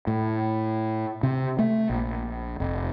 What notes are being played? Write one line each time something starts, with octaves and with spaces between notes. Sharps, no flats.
A2
C3
A3
A#1
F1